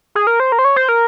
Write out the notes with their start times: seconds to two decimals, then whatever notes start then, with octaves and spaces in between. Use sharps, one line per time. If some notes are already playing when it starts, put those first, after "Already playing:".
0.15 G#4
0.27 A#4
0.40 C5
0.52 A#4
0.59 C5
0.65 C#5
0.76 C5
0.89 A#4